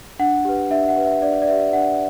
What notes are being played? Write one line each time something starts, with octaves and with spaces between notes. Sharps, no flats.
D4 F#5
G4 B4
D4 E5
F#5
G4 B4
E5
D4 D5
D5
G4 B4 E5
D4 F#5